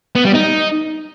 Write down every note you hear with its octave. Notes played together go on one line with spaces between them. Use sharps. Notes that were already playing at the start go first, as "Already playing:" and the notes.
B3
G3
D#4